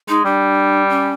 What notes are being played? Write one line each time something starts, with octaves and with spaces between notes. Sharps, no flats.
G#3 D#4
G3 D4
C#4